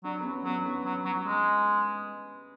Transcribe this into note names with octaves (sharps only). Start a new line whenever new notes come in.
F#3 D4
B3
C#4
F#3 B3
B3
F#3
F#3
G#3